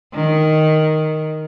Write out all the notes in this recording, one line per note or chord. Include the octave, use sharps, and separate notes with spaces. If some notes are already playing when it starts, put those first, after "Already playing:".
D#3